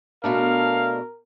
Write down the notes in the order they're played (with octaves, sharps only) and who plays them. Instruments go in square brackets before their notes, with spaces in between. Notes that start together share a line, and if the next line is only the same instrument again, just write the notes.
[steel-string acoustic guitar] B2 A3 D4 [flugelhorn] A#4 [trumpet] F5